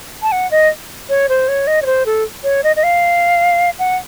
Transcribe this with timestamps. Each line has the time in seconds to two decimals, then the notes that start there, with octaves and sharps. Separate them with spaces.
0.22 A5
0.32 F#5
0.51 D#5
1.09 C#5
1.29 C5
1.48 C#5
1.67 D#5
1.82 C#5
1.86 C5
2.06 A4
2.44 C#5
2.64 D#5
2.76 D#5
2.83 F5
3.79 F#5